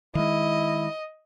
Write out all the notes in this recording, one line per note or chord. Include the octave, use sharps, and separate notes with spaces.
D#3 G#3 E4 D#5